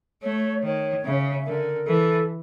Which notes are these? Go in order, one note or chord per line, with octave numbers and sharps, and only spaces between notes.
A3 C#5
D#3 C#5
C#3 E5
D3 A#4
E3 A4